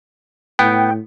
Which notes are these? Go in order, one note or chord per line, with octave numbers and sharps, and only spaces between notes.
A2 B3 G5